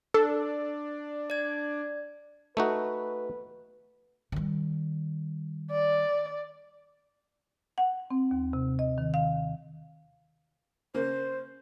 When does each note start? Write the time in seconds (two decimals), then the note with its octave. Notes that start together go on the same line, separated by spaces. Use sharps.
0.14 D4 A4
1.30 D5 G#6
2.57 A3 D#4 F#4 B4
4.32 D#3 G3
5.71 D5
7.78 F#5
8.10 C4
8.31 D#2
8.53 C3
8.79 D#5
8.98 D#3
9.14 F5
10.94 C#3 A#3 C5